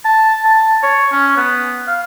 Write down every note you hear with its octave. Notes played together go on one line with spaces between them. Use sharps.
A5
A5
C#5
C#4
B3
F5